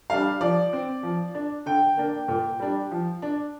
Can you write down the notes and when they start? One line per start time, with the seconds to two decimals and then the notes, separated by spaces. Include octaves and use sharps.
0.10 G3 D4 F5
0.41 F3 D5
0.73 C4
1.03 F3
1.35 D4
1.66 D3 G5
1.97 A#3 D4
2.28 A#2
2.60 G3 D4
2.91 F3
3.22 D4